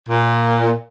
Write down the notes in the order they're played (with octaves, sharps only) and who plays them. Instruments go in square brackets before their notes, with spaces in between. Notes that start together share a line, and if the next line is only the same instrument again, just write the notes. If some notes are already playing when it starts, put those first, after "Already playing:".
[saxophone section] A#2